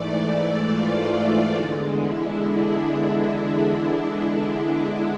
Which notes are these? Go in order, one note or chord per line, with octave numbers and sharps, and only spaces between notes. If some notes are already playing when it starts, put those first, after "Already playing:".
Already playing: G#2 E3 A3 D5
F4
E2 D3 G#3
E4
D4